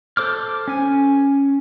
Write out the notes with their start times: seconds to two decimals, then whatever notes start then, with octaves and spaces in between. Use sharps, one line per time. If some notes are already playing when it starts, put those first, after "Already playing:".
0.17 A4 C5 D6 F6
0.68 C#4 G#5